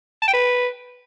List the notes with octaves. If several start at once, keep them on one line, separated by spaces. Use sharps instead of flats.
A5
G5
B4